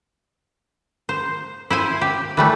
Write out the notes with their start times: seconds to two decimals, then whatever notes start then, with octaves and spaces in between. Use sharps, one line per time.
1.09 C5
1.70 E4 C5 G#5
2.01 G4
2.37 E3 G3 A3